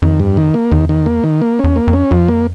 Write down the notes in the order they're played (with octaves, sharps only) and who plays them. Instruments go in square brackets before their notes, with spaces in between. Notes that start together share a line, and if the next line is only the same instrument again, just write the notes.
[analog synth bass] F2 [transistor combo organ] D#3
[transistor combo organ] G2
D#3
A#3
[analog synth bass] E2 [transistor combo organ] D#3
[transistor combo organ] D#3
A#3
D#3
A#3
[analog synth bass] E2 [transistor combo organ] C#4
[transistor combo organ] A#3
[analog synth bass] F2
[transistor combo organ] C#4
[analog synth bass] F2 [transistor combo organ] F3
[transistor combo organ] A#3